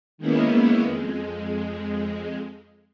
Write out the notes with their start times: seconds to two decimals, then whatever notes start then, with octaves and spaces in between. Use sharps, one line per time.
0.18 D#3 G#3 A#3 B3 C#4 E4
0.82 F2 G#3